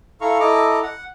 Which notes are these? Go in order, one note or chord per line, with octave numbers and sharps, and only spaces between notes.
E4 A4 F5 A#5 C#6
E4 A4 D#5 A#5 D6
F#5